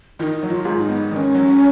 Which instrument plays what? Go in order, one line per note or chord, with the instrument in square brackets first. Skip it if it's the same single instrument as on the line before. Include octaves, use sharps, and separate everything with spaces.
[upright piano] D#3 [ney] F4
[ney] D#4
[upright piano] F#3
[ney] F4
[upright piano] G#2
[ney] D#4
[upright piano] B3
[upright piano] D#3 [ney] D#4
[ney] C#4
[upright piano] F#3